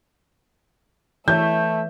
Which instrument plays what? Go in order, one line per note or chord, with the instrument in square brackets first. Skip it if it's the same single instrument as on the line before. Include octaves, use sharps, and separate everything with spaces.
[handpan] E3 C#5 [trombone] A3 [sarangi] E5 [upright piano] G6